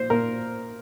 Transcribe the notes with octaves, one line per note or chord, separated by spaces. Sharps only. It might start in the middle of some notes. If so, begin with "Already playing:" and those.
Already playing: A#2 C5
A#2 A#4